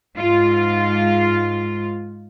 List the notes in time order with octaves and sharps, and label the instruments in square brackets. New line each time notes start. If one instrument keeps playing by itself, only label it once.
[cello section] G#2 F4